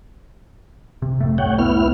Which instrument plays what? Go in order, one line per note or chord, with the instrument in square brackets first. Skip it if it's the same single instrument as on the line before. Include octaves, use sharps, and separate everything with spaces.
[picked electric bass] C3
F2 A2 A3
[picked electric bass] C2 A3 [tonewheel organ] C#5 F#5 G5
[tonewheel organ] B3 E4 F6